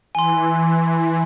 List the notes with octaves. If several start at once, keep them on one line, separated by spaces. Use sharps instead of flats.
E3 G#5 C6